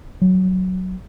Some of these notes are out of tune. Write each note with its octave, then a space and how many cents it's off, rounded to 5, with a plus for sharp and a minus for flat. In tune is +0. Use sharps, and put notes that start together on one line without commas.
F#3 +5